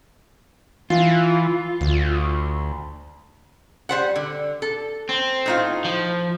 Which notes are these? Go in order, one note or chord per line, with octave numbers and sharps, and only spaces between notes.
E3 F4
D2
G3 C5 F#5
D3
A4
C4
A2 D#4 F4
F3